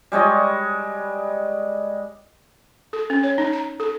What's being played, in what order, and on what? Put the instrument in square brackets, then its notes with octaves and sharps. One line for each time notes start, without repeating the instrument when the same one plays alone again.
[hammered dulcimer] G3 G#3 C#5 D#5
[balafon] A4
C#4
C#5
D#4
A#5
A4